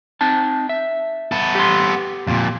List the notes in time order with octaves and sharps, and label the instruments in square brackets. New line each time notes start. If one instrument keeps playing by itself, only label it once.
[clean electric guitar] C4 D#4 A5
E5
[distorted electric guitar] B3 A4
[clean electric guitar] G4 C6
[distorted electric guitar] F2 A#2